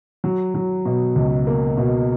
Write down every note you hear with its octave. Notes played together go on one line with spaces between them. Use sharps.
F#3
F#3
B2
C#2
A#3
B2